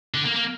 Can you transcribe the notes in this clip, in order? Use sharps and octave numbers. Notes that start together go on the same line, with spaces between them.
D3
A#3
A#3